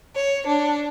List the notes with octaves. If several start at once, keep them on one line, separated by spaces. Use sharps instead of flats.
C#5
D4